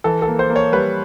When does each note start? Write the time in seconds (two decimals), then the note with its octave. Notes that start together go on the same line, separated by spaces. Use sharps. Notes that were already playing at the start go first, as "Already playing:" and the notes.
0.04 E3 A4
0.22 A4
0.28 A#3
0.39 C5
0.50 A#3
0.56 C#5
0.72 G3 B4